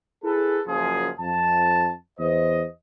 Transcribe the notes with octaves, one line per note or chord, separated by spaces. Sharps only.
E4 G#4 A4 B4
F#1 F#2 F3 G#4
F2 A5
E2 C5 D#5